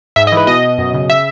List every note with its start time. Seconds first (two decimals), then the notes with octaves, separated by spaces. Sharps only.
0.16 G#2 E5
0.27 D#5
0.32 E3 B4
0.47 B2 D#5
0.63 B2
0.78 F#2
0.94 C#3
1.10 E5